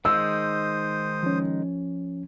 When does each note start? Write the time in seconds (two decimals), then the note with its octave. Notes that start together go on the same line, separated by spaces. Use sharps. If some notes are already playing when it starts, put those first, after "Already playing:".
0.05 D#3 G#3 D#4 C5 D#6 E6
1.23 F3 C#4